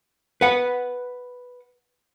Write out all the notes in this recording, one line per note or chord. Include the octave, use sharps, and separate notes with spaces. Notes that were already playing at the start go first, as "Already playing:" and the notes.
B4 F#5